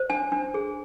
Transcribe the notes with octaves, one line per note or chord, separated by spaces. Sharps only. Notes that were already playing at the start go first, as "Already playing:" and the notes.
Already playing: C5
D4 G#5
D4
G#4